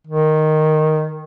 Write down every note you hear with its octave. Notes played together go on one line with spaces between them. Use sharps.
D#3